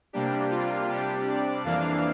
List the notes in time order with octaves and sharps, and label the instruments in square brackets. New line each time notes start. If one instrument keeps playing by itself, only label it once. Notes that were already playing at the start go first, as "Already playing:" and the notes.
[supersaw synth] C3 G3 A#3 D4 G4
F4
C3 G3 D4 G4
D5
F2 E3 A#3 D4 F5